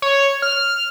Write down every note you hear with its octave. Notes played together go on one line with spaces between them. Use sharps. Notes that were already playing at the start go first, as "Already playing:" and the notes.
C#5
F6